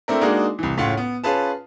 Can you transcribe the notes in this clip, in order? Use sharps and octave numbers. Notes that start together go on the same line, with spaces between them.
A3 C4 D4 E4 A#4
G#3 A#3 D4 D#4 F#4 G#4
C2 E3
F#1 A2 C#4 F4 C#5 F#5
B3
C#4 F4 G#4 B4 A5